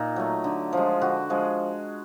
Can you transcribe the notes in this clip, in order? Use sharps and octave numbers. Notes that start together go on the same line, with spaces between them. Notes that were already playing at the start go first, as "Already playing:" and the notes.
Already playing: A#2 D#4
F#3 A3
D3
F3 G#3
D3 F#4
F3 G#3